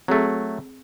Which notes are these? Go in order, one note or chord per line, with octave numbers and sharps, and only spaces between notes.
F#3 A3 C4 G#4 A4